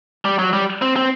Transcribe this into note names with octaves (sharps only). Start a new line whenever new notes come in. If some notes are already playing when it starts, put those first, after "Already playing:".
G3
F#3
G3
C4
C4